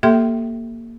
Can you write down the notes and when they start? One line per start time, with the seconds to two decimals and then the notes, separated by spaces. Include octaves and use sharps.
0.03 A#3 G4 A4 E5 G5 C6